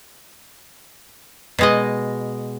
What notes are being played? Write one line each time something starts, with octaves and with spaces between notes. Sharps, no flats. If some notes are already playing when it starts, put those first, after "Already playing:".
B2 G#3 D#5